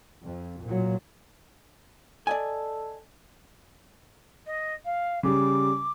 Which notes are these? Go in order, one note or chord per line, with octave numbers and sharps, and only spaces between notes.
F2
A#2 F#3
A4 D5 D#5 G#5
D#5
F5
C#3 G3 D6